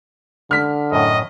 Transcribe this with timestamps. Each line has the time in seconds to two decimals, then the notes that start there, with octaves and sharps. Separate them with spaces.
0.51 D3 F6 B6
0.92 F#2 A2 D#5